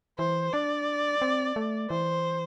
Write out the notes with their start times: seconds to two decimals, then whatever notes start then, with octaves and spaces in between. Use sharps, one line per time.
0.19 E3 C5
0.53 D4 D5
1.22 C4
1.56 A3
1.90 E3 C5